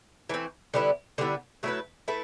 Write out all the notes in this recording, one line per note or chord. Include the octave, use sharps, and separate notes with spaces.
E3 A3 C4
D3 G3 B3 E4
D3 G3 B3 E4
F#3 A3 E4 B4
A3 E4 B4